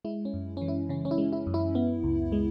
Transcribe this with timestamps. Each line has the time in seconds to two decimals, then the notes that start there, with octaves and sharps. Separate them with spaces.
0.05 G#3 E4
0.25 C#4
0.34 F#2
0.57 E3 C#4
0.68 E4
0.89 C#3 C#4
1.05 C#4
1.11 E4
1.18 G#3
1.32 E4
1.47 F#2
1.54 E4
1.75 B3
2.03 C#2
2.32 G#3